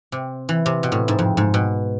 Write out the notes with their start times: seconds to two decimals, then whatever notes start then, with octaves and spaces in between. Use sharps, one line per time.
0.12 C3
0.49 E3
0.66 C3
0.83 B2
0.92 A2
1.08 G#2
1.19 F2
1.37 G#2
1.54 B2